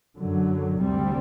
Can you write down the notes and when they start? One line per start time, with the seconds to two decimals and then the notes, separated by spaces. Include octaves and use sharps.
0.18 F#2 D3 F#3
0.81 D2 C3 G3 C4